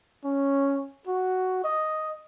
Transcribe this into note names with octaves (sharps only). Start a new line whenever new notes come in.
C#4
F#4
D#5